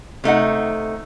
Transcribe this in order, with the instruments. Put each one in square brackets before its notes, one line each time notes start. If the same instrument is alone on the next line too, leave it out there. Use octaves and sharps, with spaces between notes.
[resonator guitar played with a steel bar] C3 A3 D#4 F#5